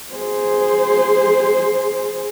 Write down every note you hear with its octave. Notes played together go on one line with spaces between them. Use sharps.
G#4 C5